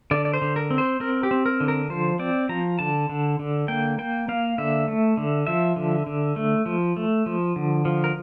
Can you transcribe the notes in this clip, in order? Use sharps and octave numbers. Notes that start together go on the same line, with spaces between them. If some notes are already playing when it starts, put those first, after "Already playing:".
D3 D5
D5
C5
D3
A#4
C4
C5
C4 A#4
G4
C4
A#4
D3
A#4
F3 C5
C4 D5
F3 A#5
D3 A5
D3
D3
A#3 G5
A#3 G5
A#3 F5
D3 E5
A3
D3
F3 E5
D3
D3
A3
F3
A3
F3
D3
F3
A#4